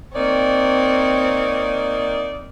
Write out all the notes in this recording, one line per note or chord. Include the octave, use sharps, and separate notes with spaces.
A#3 C4 D#4 C#5 D5